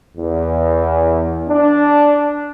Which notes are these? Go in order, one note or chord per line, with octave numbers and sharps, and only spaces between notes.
E2
D4